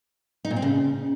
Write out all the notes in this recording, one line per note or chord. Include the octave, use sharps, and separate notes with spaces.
D#4
A#2
C4
C#3